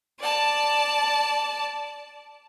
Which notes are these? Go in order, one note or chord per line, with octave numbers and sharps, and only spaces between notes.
D5 A5